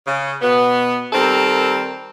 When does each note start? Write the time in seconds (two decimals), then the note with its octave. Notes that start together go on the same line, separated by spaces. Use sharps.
0.06 C#3
0.41 B2 B3
1.13 D#3 G3 C4 A4 A#4